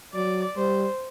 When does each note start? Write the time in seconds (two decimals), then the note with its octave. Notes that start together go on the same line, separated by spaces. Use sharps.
0.14 F#3 D5
0.57 G3 C5